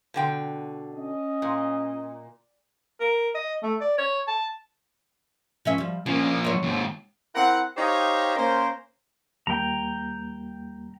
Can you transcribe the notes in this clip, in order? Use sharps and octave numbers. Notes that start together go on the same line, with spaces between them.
B2 D3 G5
C#4 D#5
A#2
A#4
D#5
A3
D5
C#5
A5
F3 C#4 E5
F3 G3
F3 A#3 C#4
C5 C#5
D#2 G#2
C4 E4 A#4 F#5
D#4 G4 C5 C#5 D#5 F5
A#3 C#4 A#4 C5
D#2 G3 A#3 G5 A#5